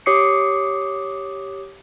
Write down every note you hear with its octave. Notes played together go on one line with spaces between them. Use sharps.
G4 C#5 D6 D#6 C7 C#7